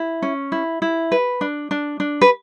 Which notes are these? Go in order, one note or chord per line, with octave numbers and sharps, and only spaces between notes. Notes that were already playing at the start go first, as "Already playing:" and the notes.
Already playing: E4
C#4
E4
E4
B4
D4
D4
D4
B4